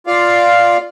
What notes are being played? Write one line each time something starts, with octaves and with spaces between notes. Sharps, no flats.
F4 D5 F5